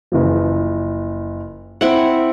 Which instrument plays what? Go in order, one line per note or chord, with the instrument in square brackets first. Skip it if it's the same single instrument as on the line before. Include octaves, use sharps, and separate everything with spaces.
[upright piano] F#1 E3 F3
[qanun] C4 E4 F#5 [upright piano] F#7